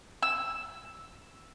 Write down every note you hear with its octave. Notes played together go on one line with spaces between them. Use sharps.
E6